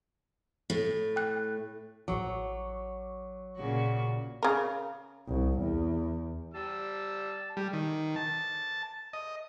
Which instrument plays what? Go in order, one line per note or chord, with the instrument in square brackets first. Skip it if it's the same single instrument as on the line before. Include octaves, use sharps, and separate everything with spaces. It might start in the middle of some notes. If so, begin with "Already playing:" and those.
[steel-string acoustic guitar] A2
[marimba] G5 F#6
[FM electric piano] A1 C#6 D6 [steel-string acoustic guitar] F#3
[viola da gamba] A#2 C#3 F#4
[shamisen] C#3 A#4
[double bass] C2
E2
[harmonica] G3 E6 [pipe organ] A5
[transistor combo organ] G3
D#3
A5
D#5